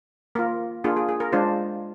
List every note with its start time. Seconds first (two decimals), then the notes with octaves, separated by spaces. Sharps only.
0.35 A#3 F4 A#4
0.84 A#3 D4 F4 G#4
0.97 G#4
1.09 G#4
1.20 A#4
1.33 G#3 D4 F4 C5